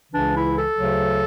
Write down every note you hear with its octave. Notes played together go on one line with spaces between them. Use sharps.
C#2 C#3 E3 D4
E4
A4
D2 C#3 F#3